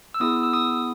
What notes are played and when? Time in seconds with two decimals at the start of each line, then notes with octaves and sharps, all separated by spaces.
0.14 E6
0.20 B3 E4 G#4 D#6
0.43 E6
0.53 D#6